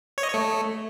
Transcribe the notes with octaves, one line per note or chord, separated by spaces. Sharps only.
C#5
D#5
C#5
A3